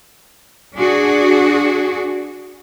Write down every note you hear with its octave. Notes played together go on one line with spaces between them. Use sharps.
D4 F#4 G#4